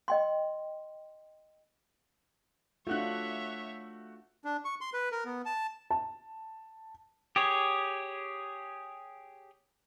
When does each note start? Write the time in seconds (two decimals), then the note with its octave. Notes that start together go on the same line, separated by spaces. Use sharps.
0.08 D#5 G5 C6
2.87 A3 D4 F4 F#4 C#5 E5 F#6
4.45 D4
4.65 C#6
4.81 C6
4.94 B4
5.12 A#4
5.25 B3
5.46 A5
5.90 A5
7.36 G4 G#4 C#5